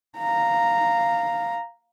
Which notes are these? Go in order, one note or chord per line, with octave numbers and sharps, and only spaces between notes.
F5 A#5